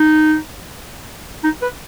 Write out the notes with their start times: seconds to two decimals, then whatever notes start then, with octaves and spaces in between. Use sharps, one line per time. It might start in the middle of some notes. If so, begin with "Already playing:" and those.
Already playing: D#4
1.44 D#4
1.62 B4